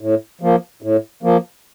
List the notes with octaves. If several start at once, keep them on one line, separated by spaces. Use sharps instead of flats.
A2
F3 A#3
A2
F3 A#3